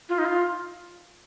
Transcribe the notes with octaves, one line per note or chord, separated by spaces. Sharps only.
F4
D#4
F4